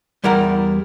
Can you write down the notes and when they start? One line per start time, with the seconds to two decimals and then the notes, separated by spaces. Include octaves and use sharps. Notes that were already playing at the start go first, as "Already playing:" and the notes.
0.24 E2 G3 E4 A#4 F#5